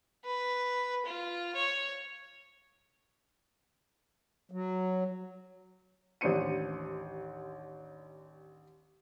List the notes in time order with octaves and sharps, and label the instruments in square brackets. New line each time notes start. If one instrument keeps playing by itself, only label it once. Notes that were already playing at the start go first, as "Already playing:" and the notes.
[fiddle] B4
F4
C#5
[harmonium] F#3
[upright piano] A1 D#2 D4 C5 C#7 D#7